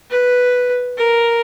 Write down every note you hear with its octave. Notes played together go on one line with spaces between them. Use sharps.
B4
A#4